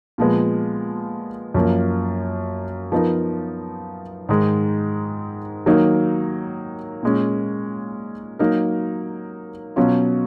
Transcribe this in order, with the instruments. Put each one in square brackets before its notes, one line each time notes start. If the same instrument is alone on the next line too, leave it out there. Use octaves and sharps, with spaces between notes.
[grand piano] A#2 F3 G#3 B3
F#2 F3 A#3
F3 B3 D#4 A#4
G#2 D#3 G#3
D#3 F#3 A#3 D#4
A#2 G#3 C#4
F#3 A#3 D#4 A#4
B2 F#3 C#4 F4